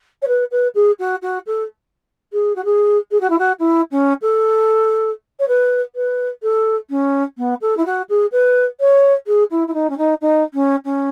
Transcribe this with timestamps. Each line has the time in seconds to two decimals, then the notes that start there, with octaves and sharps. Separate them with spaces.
0.22 C#5
0.27 B4
0.51 B4
0.75 G#4
0.99 F#4
1.22 F#4
1.46 A4
2.33 G#4
2.55 F#4
2.65 G#4
3.11 G#4
3.20 F#4
3.30 E4
3.38 F#4
3.59 E4
3.91 C#4
4.21 A4
5.39 C#5
5.48 B4
5.95 B4
6.42 A4
6.90 C#4
7.38 B3
7.61 A4
7.77 E4
7.85 F#4
8.09 G#4
8.32 B4
8.80 C#5
9.27 G#4
9.50 E4
9.67 E4
9.73 D#4
9.89 C#4
9.97 D#4
10.21 D#4
10.54 C#4
10.84 C#4